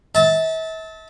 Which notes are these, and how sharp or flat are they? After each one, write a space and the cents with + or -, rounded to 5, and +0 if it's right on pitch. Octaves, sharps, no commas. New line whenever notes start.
E5 -40 A5 +0